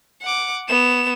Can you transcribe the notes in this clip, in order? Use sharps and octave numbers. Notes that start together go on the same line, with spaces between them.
F#5 D6
B3 E7